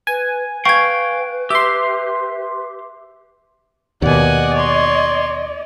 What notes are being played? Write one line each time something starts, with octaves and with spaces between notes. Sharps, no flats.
B4 G#5
B4 F5 G5 C#6 G#6
G4 E5 C6
D#2 B2 D5 D#5 F#5 G#5
C#5 C6